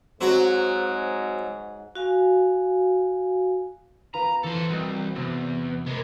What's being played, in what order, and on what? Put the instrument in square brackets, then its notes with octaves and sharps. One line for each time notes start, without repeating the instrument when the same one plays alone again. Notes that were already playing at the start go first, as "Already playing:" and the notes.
[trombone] G#2 [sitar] F#3 [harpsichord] C4 F#4 A#5
[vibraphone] F#4 F5 G#5
[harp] B3 F4 B4 [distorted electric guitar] A#5
[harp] E3 [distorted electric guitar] A4 C5
[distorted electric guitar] C2 [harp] F#3 D#5
[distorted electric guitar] E2 [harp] C3 C4 E6
[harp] C3 A#3 [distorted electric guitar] G#3 B3